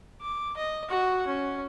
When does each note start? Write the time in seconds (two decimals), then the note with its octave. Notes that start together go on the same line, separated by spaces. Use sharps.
0.21 D6
0.57 D#5
0.89 F#4 F#5
1.26 C#4